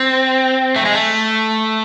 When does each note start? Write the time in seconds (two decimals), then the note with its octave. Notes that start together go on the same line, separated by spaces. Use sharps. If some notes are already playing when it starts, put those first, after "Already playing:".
Already playing: C4
0.76 A3
0.85 G#3
0.94 A3